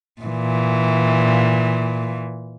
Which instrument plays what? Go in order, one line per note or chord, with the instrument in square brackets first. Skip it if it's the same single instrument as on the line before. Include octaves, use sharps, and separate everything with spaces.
[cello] A#2 E3